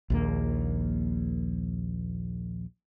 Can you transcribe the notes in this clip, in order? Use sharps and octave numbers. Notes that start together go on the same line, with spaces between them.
A#1 D#2 A#3